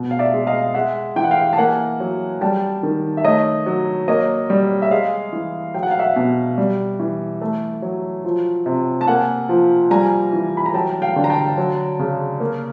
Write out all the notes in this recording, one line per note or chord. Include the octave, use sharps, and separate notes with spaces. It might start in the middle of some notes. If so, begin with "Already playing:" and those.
Already playing: B2
F5
D5 E5
G#3
D#5 F5
G#3 E5 F#5
E3 G5
F#5
F5 G5
A5
A#3 F#5 G#5
F#3
G3 G5 A5
D#3
E5
A3 C#5 D#5
F#3
A#3 C#5 D#5
G3
E5
G#3 D#5 F5
E3
F#3 G5
F#5
F5
E5 F#5
B2
G3
E3
A3
F#3
F3
C3
A5
A#3 F#5 G#5
F3
G3 G#5 A#5
E3
B5
A#5
F#3 G5 A5
F5 G5
D3
A#5
G5 A5
F#3
C#3
A#3